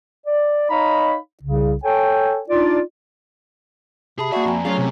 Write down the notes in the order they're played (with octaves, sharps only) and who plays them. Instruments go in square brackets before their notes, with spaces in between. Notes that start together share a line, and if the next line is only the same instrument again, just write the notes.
[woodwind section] D5
D#4 C#5 D#5 F5 A#5 B5
C2 C#3
A4 C#5 G5 G#5
D4 D#4 F4 D5
[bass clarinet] C3 [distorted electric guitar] G#4 [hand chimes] A5 B5
[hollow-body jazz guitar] A#3 E5 [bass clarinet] F#4 [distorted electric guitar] G#4 G#5 [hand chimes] D5
[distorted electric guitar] F2 [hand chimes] G#5 A#5
[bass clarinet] F#3 [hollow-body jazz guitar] A3 C#4 G#4 [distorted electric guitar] F4
[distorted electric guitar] C3